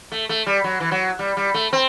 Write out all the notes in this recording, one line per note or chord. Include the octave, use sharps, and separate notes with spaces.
A3
A3
G3
F#3
E3
F#3
G3
G3
A3
C4